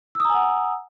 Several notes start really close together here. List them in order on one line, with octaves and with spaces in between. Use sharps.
E6 D#6 A#5 G#5 F#5